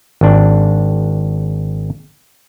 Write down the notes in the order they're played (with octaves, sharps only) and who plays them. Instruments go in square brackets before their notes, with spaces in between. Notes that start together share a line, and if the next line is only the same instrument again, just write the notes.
[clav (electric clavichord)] G#1 D4